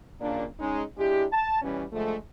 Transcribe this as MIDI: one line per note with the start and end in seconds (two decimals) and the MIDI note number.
0.21 0.45 39
0.21 0.45 46
0.21 0.45 49
0.21 0.45 58
0.21 0.45 62
0.59 0.83 56
0.59 0.83 61
0.59 0.83 63
0.97 1.25 56
0.97 1.25 62
0.97 1.25 64
0.97 1.25 67
1.33 1.61 81
1.62 1.84 47
1.62 1.84 52
1.62 1.84 55
1.62 1.84 61
1.93 2.16 50
1.93 2.16 53
1.93 2.16 56
1.93 2.16 57